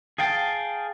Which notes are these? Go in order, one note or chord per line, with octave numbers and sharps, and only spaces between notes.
G#4 F5 G5 A5